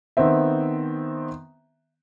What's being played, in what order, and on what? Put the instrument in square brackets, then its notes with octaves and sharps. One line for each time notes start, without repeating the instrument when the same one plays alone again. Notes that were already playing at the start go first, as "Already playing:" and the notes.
[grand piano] D#3 B3 C4 E5